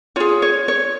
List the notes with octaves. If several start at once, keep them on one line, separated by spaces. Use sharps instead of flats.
F4 G#4 C#5
C#5
C#5